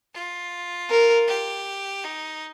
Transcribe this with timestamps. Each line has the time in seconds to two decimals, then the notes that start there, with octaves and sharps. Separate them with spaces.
0.14 F4
0.90 A#4
1.28 G4
2.04 D#4